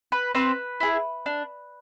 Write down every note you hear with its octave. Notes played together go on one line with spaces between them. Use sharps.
B4
C4 B4
E4 G#4
D4